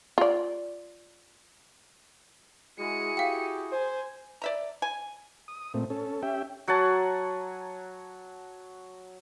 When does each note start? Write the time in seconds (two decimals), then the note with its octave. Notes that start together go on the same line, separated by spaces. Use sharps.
0.18 F4 D5
2.79 G#3 E4 F#4 G#4 C#7 D#7
3.17 G4 F5 G5
3.72 C5 G#5
4.42 D5 E5 A#5
4.82 G#5
5.48 D#6
5.74 A#2 A3 C4
5.90 C#4 A4
6.23 C#4 G4 E5 G5
6.68 F#3 F#5 G#5 A5